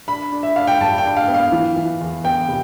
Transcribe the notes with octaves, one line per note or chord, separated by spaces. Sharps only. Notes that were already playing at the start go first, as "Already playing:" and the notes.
D4 B5
D4
E5
D4 F5
G5
G2 A5
G5
D4
F5
B3
F5
E3
E3
E2
B3 G5
C3